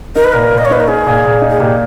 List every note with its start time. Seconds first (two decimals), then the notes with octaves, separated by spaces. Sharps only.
0.15 D#4 A#4
0.24 B4
0.33 A#2 A#4
0.52 A#2
0.58 D#5
0.65 C#5
0.70 D#4 B4
0.80 A#4
0.88 D#4 G#4
1.06 A#2
1.24 A#2
1.41 D#4
1.50 G#4
1.60 A#2 G4